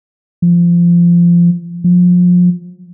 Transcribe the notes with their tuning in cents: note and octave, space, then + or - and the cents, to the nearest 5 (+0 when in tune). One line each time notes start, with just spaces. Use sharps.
F3 -20
F3 +30